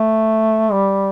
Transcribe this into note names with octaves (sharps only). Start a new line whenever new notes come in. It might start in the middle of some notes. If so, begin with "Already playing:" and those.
Already playing: A3
G3